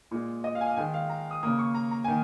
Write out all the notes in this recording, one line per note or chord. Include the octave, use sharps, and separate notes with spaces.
A#2 G#3
D#5
F5
G#5
F5
D#3 G#3 G#5
F5
A#5
D#6
C#3 A#3 D#6
C#6
A#5
A#5
D#3 A#3 G#5